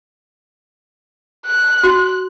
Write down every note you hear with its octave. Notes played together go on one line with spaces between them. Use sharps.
F#6
F#4